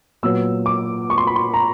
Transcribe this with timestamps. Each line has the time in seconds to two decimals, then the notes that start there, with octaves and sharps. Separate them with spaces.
0.23 A#2 F#3 B3 E6
0.66 D6
1.10 C#6
1.18 C6
1.27 B5
1.36 C6
1.54 A#5